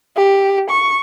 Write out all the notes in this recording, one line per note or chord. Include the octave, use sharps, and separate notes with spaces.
G4
C#6